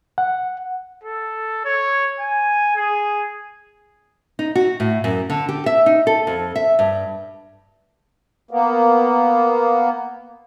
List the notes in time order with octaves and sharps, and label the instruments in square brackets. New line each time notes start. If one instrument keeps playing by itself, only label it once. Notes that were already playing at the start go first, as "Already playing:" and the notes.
[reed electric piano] F#5
[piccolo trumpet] A4
C#5
G#5
G#4
[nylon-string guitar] D#4
F#4
A2
F#2
D3
G4
E5
D#4
A4
F2
E5
G2
[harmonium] A#3 B3